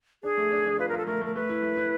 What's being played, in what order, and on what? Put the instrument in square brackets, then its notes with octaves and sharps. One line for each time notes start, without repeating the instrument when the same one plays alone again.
[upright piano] D4 [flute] G#4
[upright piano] A3
D4
D4
[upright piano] F4 [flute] B4
[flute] A#4
[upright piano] F4 [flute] A4
[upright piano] A3 [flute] A#4
[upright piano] A3 [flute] A#4
[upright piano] A3 [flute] B4
[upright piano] E4
A3
E4